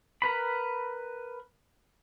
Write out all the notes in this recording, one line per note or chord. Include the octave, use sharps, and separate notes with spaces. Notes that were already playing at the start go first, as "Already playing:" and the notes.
A#4 B4 B5